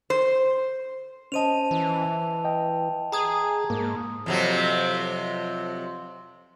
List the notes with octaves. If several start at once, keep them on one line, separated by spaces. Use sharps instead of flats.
C5
C#4 C5 D#5 A5 D#7 F7
E3
D#5 G5
G#4 A#5 D#6 G#6
G#2 A#3
F2 C3 F#3